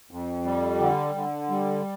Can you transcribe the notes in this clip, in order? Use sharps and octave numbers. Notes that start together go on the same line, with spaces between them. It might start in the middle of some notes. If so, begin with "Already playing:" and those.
F2
G3
D3
D3
G3